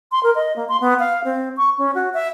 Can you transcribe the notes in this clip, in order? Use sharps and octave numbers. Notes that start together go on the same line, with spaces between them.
C6
A#4
D#5
A#3
C6
B3
F5
C4
C#6
C#4
F#4
E5